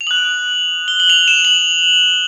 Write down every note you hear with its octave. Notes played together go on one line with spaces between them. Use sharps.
F7
D#6 F#6 F#7
G7
F#7
F7
E7
F#7